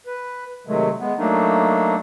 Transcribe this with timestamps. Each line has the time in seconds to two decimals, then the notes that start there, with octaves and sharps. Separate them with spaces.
0.07 B4
0.67 C3 D#3 F#3 G#3 A3
1.00 G#3 B3
1.18 F#3 A3 A#3 D4 D#4